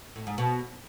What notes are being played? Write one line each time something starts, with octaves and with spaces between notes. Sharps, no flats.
A2
G#2
B2